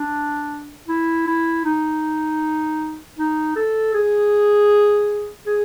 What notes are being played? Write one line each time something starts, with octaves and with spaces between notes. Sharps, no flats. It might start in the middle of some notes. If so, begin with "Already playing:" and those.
Already playing: D4
E4
E4
D#4
D#4
A4
G#4
G#4